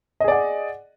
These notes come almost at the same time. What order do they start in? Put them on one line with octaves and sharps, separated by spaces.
D#5 G#4 D5 F#5